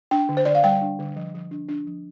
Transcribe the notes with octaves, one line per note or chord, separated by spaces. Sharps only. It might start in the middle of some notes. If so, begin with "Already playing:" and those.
D4 G5
D3
C5
D3 D5
F5
G3 G5
D4
D3
F3
F3
D4
D4
F3